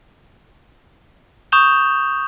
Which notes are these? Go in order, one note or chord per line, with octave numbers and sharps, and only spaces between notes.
C#6 D#6 G6 E7 F7 G7